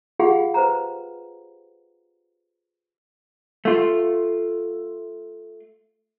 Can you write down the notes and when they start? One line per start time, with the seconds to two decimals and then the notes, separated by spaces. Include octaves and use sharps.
0.19 F4 G4 G#4 F5 F#5 B5
0.54 B4 C5 A#5
3.65 A3 F4